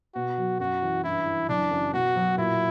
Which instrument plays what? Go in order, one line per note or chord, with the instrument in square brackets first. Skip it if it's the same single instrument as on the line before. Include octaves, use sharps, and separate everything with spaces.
[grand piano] B2 [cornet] F#4
[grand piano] F#3
[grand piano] F#2 [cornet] F#4
[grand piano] E3
[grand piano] G2 [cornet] E4
[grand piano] E3
[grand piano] F#1 [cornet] D4
[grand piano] F#2
[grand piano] B2 [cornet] F#4
[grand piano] F#3
[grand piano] A#2 [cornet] E4